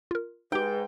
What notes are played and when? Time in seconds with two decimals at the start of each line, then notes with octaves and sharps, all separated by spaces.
0.11 F4 A#4
0.52 G#2 D#4 G4 B4 G5